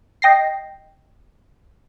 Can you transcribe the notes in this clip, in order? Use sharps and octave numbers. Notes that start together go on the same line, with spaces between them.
D#5 G5 A#6 C7